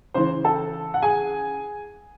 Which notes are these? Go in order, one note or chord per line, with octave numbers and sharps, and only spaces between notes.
C#3 E3 C5 C6
A4 A5
F#5
G#4 G#5